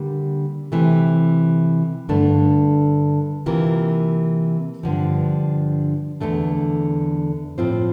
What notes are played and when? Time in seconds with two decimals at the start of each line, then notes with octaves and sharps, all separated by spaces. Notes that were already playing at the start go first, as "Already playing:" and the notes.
Already playing: D3 G3 A#3
0.72 C3 E3 A3
2.09 G2 D3 A3 D4
3.46 C3 E3 A#3 F4 A#4
4.83 G2 D3 F3
6.21 E2 D3 A3 D4
7.58 A2 F3 C4 F4 C5